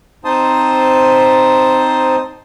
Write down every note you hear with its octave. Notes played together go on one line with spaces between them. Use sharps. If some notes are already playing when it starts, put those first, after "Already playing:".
C4 D#4 C5 A5 C6 D#6